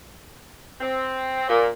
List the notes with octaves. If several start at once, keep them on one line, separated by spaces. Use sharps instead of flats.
C4
A#2